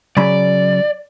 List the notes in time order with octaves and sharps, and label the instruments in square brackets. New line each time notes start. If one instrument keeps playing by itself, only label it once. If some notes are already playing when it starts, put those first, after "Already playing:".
[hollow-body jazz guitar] C#3 F#3 B5 [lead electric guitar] D5